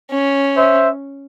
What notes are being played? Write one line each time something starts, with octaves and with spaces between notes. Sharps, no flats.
C#4
C5 E5